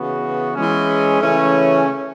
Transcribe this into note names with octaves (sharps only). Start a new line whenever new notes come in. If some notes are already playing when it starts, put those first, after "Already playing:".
Already playing: C#3 E3 B3 F#4
E3 G#3 C#4
C#3 E3 A3 C#4